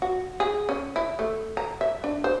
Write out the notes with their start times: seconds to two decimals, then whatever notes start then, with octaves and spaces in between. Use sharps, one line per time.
0.02 F#4
0.40 G#4
0.69 C#4
0.96 E4
1.19 A3
1.57 A#5
1.81 E5
2.04 D4
2.24 C5